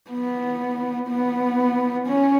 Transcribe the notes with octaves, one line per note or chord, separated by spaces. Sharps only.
B3
B3
C#4